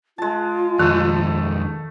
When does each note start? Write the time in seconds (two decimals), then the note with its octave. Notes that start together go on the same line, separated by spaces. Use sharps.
0.18 G#3 F4 A5
0.79 F2 D#3 G#3 A3